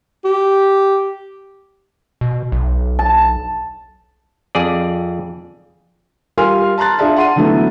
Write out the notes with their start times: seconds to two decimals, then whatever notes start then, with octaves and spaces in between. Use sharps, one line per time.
0.25 G4
2.21 B2
2.52 B1
2.99 A5
4.55 F2 G#4 D5
6.37 G3 F4 A#4 G#5 C6 F6
6.78 A5 A#5 C6 F#6 A6
6.98 D4 F4 G#4 D5 E5 A5
7.16 F#5 C6 D#7
7.36 D3 E3 F#3 A3 B3